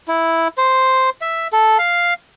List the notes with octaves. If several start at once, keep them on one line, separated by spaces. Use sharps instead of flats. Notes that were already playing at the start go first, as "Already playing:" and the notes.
E4
C5
E5
A4
F5